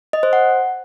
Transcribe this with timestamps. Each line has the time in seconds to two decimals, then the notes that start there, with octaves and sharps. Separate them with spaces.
0.13 D#5
0.23 C5
0.33 F#5